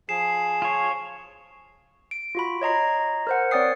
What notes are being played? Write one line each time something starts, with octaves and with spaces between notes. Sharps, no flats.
F3 G#4 C7 E7
F4 C#5
D7
F4 F#4 B5
C#5 D#5 A#5 C7
A#4 C5 F#5
C4 C#5 D5 G5 D#6 C7